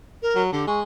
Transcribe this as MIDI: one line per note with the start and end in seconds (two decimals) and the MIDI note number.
0.22 0.41 70
0.35 0.51 54
0.52 0.66 50
0.52 0.63 67
0.67 0.82 56
0.67 0.79 85